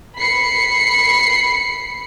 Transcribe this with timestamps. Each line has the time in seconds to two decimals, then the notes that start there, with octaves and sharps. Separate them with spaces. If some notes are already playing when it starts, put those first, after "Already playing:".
0.16 B5 C7 C#7